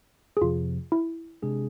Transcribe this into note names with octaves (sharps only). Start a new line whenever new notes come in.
G#4
F2 C3 F3 F4
E4
C3 G#3 D4 G#4